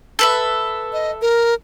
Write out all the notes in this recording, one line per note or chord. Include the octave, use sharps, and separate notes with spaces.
A4 B4 E5
D#5
A#4